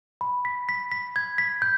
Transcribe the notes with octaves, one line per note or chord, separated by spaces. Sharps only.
B5
B6
B6
B6
G#6
B6
G6